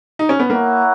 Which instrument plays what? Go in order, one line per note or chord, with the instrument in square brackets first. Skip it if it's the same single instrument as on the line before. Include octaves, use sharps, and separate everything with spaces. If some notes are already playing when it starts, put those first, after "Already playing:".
[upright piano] D#4
C#4
B3
[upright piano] A#3 [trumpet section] E4 A#4 C#5 F#5